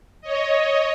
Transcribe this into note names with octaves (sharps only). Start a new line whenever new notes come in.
C#5 D#5